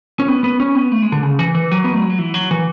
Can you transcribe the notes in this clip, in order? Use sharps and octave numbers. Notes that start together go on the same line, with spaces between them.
C#4
B3
B3
C#4
B3
A3
G#3
D3
C#3
E3
E3
F#3
B3
A3
G#3
F#3
E3
F#3
E3